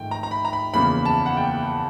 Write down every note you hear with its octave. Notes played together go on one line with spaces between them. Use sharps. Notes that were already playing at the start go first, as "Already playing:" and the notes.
Already playing: G#1 G#2 F3 A3 G5
A#5
A#5
B5
A#5
B5
F#1 E2 C#3 F3 A#3 B5
A5
F#5
G5